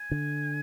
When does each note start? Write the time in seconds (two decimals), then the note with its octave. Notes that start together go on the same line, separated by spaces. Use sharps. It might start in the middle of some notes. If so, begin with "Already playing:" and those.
Already playing: G#5
0.11 D3